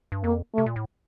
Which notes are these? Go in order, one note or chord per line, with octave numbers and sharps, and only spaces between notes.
G2
F2 A#3
C3 A3
A#2
A2